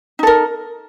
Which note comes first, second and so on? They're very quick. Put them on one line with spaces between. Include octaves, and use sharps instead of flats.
D#4 A4 A#4